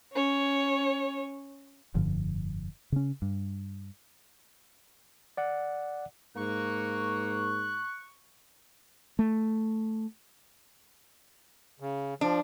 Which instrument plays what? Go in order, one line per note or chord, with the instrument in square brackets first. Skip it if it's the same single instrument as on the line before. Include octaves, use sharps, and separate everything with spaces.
[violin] C#4 C#5
[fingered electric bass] F1 G2 D3 F3
C#3 C#4
G2
[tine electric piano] D5 F#5
[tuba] G#2 [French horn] A#3 [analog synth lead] C#6 [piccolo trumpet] F#6
[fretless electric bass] A3
[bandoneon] C#3
[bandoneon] F3 [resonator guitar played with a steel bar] D4